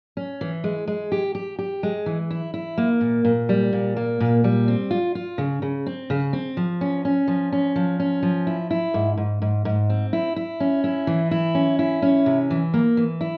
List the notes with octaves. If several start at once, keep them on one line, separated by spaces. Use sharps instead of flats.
C#4
E3
G#3
G#3
G4
G4
G4
G#3
E3
E4
E4
A#3
A#2
A#2
G3
A#2
A#3
A#2
G3
C4
F4
F4
C#3
C#3
C4
C#3
C4
F3
C#4
C#4
F3
C#4
F3
C#4
F3
E4
E4
G#2
G#2
G#2
G#2
C4
E4
E4
C#4
E4
E3
E4
C#4
E4
C#4
C3
E3
A#3
E3
E4